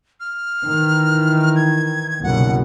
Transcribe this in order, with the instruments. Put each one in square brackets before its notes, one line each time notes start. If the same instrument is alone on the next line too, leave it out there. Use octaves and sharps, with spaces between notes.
[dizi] F6
[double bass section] D#3 E3
[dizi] G#6
[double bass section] F#1 C2 B2 [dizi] F#5